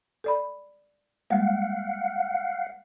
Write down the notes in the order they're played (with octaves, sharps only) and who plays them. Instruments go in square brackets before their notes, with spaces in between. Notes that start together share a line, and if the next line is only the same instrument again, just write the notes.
[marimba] A4 D5 B5
[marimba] G3 G#3 A#3 [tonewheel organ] F5 F#5